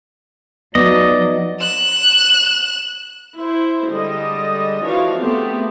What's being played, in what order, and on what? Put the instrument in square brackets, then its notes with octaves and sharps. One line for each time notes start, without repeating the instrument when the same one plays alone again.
[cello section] F3 F#3 [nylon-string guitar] B3 D#4 [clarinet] D5 [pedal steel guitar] D#5
[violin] F#6 E7
[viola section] E4 C5
D3 G3 G#3 D#5
E3 F3 D4 F#4 C#5 F5
A3 B3 C4 G4 G#4